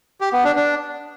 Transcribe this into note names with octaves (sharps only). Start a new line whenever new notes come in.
G4
B3
D4
D4